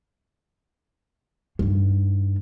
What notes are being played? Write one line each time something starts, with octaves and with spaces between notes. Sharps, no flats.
G2 D#3